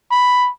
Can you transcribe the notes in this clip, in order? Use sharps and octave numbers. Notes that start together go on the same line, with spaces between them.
B5